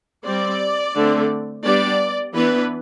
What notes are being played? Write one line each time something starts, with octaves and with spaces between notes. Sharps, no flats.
G3 C4 D5
D3 A3 C4
G3 B3 D4 D5
E3 B3 D4 B4